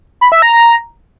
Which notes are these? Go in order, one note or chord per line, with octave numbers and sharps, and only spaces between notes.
B5
E5
A#5
A#5